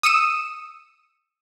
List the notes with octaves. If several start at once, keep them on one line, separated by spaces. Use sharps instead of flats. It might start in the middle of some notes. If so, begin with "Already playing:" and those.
D#6 E6 C#7 D#7 E7